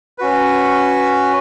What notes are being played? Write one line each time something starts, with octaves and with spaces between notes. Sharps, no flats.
C#4 F#4 B4